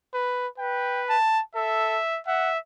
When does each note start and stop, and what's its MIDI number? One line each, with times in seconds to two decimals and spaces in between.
0.13 0.47 71
0.58 1.16 71
0.58 1.02 79
1.09 1.41 81
1.55 1.99 69
1.55 2.20 76
2.27 2.58 76
2.27 2.50 78